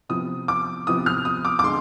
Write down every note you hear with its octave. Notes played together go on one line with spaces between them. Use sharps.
C3 F3 B3 D#6
D6
C3 F3 B3 D#6
F6
D#6
D6
D6
D3 G#3 C6